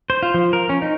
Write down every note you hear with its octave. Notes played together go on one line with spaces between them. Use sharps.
C5
F4
F3
A#4
C#4
D#4